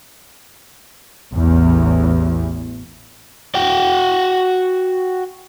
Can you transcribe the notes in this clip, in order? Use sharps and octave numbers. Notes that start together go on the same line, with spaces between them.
A1 E2
F#4 G5